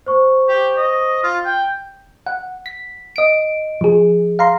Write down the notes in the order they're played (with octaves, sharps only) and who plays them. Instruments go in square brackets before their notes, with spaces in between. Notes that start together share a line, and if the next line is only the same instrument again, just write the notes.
[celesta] C5 C#6
[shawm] G4
D#5
F4
G5
[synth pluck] F#5
B6
D#5 D7
F3 G#4
F5 A#5 C6